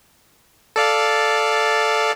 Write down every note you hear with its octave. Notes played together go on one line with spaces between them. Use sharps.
A4 D5 F5